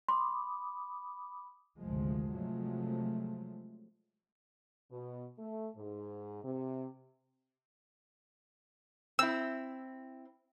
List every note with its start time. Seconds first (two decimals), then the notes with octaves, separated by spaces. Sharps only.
0.08 B5 C6 D6 D#6
1.80 G#1 D2 C3 F3 G#3
2.34 C3 F3 F#3 G#3 A3
4.91 B2
5.39 A3
5.76 G#2
6.44 C3
9.19 C4 E4 E6